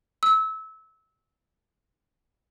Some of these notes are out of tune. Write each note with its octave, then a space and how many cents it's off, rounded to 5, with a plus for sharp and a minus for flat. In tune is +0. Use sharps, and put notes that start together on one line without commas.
E6 -25